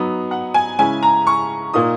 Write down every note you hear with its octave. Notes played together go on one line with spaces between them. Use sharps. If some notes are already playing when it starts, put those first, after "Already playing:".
Already playing: F#3 B3 D#4
F#5
G#5
C#3 G#3 C#4 E4 G#5
A#5
C#6
A#2 A#3 D#4 D#6